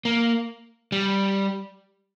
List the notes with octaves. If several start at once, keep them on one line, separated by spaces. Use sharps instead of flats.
A#3
G3